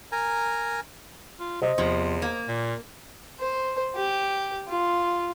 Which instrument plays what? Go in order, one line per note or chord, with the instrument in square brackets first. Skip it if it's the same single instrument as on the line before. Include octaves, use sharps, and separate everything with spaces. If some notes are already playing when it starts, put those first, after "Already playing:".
[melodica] A#4 G#5 A#5
[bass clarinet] F4
[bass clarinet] C3 [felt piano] C5 D#5
[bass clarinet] E2 [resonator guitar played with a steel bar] C3 F3
[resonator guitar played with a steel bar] A#3
[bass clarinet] A#2
[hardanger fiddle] C5
G4
F4